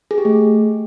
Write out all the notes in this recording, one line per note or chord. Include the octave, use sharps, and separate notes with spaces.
G#4
G4
A3